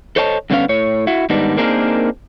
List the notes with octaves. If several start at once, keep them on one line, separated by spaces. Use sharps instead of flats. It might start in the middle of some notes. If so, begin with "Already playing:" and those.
A4 C5 C#5 D#5 G5 A5
G2 D3 D#3 B3 C#4 F5
A2 C#5
E4 F#4
G#2 D#3 G3 B3 D4 D#4
A#3 C4 D4 D#4 G#4 A#4